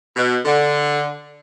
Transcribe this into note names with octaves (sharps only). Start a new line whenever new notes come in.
B2
D3